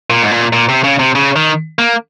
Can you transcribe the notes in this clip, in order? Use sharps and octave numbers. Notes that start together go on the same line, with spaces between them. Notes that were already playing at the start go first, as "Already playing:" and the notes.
A#2
G#2
A#2
A#2
C3
C#3
C3
C#3
D#3
A#3